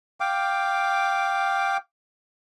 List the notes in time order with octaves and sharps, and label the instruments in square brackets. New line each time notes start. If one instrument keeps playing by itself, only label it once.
[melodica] F5 G5 D6